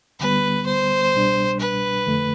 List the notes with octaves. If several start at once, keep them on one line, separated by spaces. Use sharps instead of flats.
D2 D3 G3 B3 B4
C5
C2 B2 G3 D4
B4
F2 D3 A3